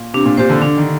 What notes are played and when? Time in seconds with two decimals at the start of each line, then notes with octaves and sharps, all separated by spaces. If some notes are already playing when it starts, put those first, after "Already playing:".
Already playing: A#2
0.14 C3 D4
0.26 A#2
0.37 A#2 G4 C5
0.50 D3
0.62 D3 D4
0.77 D#3